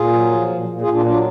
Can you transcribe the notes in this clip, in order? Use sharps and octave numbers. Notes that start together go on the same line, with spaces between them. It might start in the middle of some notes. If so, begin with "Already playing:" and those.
Already playing: A#2 F4 G#4
F#3
F3
A#2
A#2
F4 G#4
A#2
D4 F4
F#3 D4 F4